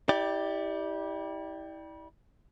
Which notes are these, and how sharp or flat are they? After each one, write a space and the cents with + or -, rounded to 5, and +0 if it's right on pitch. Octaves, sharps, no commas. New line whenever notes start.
E4 -35 G4 +0 D5 +10